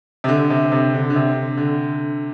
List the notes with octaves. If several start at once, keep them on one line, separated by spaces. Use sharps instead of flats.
C3
D3
C3
C3
D3
D3
C3
D3